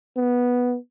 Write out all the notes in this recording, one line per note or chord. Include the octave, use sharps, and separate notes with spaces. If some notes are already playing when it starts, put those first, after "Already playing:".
B3